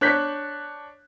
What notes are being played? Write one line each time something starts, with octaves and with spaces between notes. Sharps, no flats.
D4 C#5 F#6 G6 B6